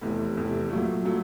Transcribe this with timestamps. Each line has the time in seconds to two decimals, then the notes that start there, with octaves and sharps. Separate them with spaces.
0.01 F1 E2 C3
0.36 F1 E2 C3
0.70 A#2 F#3 A3
1.05 A#2 F#3 A3